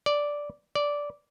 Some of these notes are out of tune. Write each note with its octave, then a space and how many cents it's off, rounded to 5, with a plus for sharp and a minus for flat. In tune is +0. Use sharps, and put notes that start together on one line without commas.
D5 -5
D5 -10